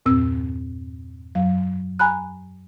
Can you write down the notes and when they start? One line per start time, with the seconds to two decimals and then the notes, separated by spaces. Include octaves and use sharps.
0.06 E2 G2 A#2 C4 E6
1.35 F#2 F#3 F5
1.99 G#5 A#5 B5 F#6